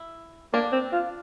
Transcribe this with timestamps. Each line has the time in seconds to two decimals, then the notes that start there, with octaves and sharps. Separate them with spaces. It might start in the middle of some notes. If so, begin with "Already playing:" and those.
Already playing: E4
0.53 A#3 D4
0.73 C4
0.93 F4